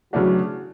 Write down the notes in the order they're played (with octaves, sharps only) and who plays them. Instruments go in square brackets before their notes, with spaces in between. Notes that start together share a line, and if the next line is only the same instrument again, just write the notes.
[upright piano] C#3 E3 A3 D4 F#4 [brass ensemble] F#3